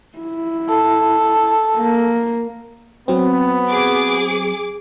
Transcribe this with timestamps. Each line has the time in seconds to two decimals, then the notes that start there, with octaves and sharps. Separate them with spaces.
0.18 E4
0.69 A4
1.78 A#3
3.08 F#3 B3 C4
3.71 G#4 D6